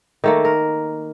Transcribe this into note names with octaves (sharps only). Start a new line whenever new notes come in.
D#3 A3 A#3
A#4